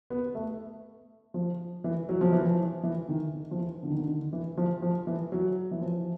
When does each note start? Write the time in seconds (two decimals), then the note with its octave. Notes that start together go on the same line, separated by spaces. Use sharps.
0.10 B3
0.35 A3
1.34 F3
1.84 E3
2.09 F#3
2.21 F3
2.33 E3
2.45 F3
2.83 E3
3.09 D#3
3.33 D#3
3.51 F3
3.58 E3
3.83 D3
3.90 D#3
3.97 D3
4.08 D#3
4.33 E3
4.57 F3
4.82 F3
5.07 E3
5.32 F#3
5.71 E3
5.81 F3